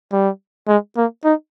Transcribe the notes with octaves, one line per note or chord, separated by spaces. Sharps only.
G3
G#3
A#3
D#4